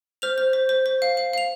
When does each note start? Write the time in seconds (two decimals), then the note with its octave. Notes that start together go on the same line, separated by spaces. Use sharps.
0.22 C5 F6 F7
0.38 C5
0.53 C5
0.69 C5
0.86 C5
1.02 F5
1.17 F5
1.33 F5 F7